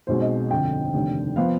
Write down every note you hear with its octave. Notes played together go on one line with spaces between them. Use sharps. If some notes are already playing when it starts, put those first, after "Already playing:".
B1 B2 G#3 C4 C5
D#5
G1 F2 D3 G5
F1 D#2 D3
F3 B3 F5